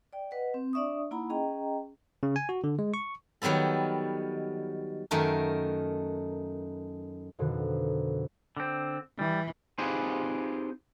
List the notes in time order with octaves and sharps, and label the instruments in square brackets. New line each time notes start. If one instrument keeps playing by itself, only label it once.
[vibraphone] D5 G5
B4 D#5 F#5
C4
D4 D5 E5 C#6 D#6
A#3 D#4 E4 F#5 A#5 B5
C#4 G#4 D#5 G5 A#5
[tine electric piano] C#3
G#5
F#4
D3
G#3
C#6
[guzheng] D#3 F#3 G3 B3 A4
F#2 D#3 A3 A#4
[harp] F2 B2 D3 D#3
[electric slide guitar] D3 C4
[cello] E3 [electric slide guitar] G3
[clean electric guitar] C4 D#4 F4 G4 G#4 B4